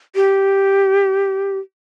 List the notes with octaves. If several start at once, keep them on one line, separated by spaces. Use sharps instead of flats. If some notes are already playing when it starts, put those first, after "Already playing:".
G4